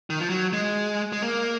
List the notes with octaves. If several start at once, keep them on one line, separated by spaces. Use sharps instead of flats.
D#3
F3
F#3
G#3
G#3
A#3